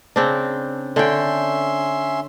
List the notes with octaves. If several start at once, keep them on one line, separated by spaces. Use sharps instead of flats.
C#3 C4 D4
D3 C#4 E5 G5 C6